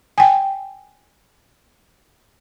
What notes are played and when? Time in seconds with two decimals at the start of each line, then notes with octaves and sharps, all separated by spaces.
0.18 G5 G#5